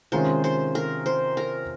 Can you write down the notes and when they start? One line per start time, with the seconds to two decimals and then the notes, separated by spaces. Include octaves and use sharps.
0.12 C3 D#3 G#3 C#4 F4 C5
0.44 C5
0.75 A#4
1.06 C5
1.37 A#4